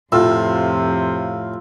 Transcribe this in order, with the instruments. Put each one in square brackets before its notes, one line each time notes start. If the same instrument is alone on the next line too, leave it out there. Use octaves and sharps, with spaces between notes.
[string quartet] F2 C3 [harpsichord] A2 [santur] F4 E6